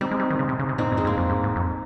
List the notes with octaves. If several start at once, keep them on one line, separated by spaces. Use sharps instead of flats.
G3 C4 D#4
G#3
G3
D#3
C#3
C3
C#3
C3
A#2 C4 D#4
G2
G#3 C4
G2 A#3
F2
G2
G#2
F2